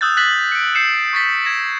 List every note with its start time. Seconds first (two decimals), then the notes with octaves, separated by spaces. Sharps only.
0.01 D#6 E6 F#6 G6 A6
0.17 F#6 A6 B6 F#7
0.52 C#7 D7
0.75 F#6 G6 C7 C#7 E7
1.13 C#6 A6 B6
1.45 G#6 A#6 E7